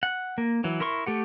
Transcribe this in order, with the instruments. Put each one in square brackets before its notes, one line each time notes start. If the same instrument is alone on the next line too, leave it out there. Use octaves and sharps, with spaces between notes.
[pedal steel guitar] F#5
A#3
E3 F#3
E4 A#4 C6 C#6
A3 G4 F#5